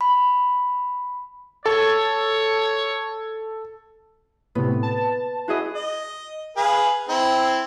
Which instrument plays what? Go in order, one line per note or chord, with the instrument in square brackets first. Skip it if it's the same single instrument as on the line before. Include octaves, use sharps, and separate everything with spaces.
[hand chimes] B5
[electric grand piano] A4 A5 [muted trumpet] C#5
[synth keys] A2 C3 [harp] B3
[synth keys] A5
[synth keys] E4 [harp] F#4 G#4 D#5
[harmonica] D#5
G#4 B4 F5
C4 E4